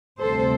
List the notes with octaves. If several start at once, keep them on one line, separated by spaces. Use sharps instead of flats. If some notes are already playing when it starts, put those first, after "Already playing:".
D2 C3 G3 C4 A4 C5